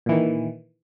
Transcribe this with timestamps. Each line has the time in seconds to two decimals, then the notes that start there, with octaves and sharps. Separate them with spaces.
0.06 A#2
0.09 E3
0.12 D#3